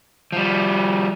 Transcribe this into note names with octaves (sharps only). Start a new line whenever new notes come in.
F3 G3